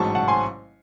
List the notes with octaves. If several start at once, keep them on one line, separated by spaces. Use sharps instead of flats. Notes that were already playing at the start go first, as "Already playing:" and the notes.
Already playing: A1 G#2 F#3 A5 C#6
F#5 A5
G#5 C6